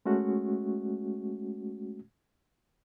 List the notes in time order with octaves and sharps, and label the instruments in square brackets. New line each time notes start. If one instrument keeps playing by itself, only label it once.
[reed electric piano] G#3 A3 C#4 F#4